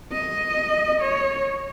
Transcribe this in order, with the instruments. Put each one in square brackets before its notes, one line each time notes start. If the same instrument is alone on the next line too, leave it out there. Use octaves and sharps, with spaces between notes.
[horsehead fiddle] D#5
C#5